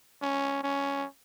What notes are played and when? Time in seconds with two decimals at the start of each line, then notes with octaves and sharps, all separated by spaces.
0.22 C#4
0.63 C#4